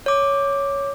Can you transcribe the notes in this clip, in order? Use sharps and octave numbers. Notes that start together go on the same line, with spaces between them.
C#5 D6